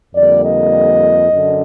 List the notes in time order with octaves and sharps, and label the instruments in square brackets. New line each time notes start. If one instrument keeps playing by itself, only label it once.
[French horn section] F2 D3 G3 A#3 D5
D#5
F#2 D3